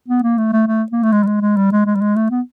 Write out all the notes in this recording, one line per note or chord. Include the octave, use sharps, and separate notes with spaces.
B3
A#3
A3
A3
A3
A#3
A3
G#3
G3
G#3
G#3
G3
G#3
G#3
G3
G#3
A3
B3